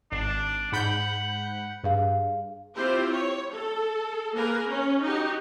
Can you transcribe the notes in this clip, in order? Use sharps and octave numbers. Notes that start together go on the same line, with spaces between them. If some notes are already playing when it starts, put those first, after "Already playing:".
G#1 D4
G#2 F#5 B5 G6
G2 G#4 F5
C4 E4 F4 G4 C5
C#5
A4
A#3 G#4 A#4 B4
C#4
D#4 F#4 G4